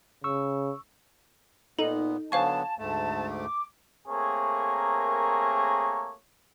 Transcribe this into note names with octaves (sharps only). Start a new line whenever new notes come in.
C#3 C#6 E6
A#2 B3 D#4 A4
D3 F#3 B3 C5 F5 G#5 A5 C#6
D2 G#2 A3 A5
D6
A3 A#3 C4 G#4 A#4 C#5